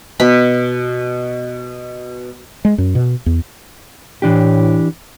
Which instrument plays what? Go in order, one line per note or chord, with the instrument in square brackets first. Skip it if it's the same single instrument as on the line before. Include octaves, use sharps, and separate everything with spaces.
[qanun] B2 B5
[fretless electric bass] G#3
F#2
B2
E2
[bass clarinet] A2 [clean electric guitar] E3 D4 G4